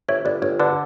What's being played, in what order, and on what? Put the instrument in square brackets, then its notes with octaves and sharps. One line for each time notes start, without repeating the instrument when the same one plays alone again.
[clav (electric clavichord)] G1 [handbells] C#5 E5
[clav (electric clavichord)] G1 [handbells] B4 D5
[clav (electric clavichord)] G1 [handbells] C#5
[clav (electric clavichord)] D3 [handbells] B4 D5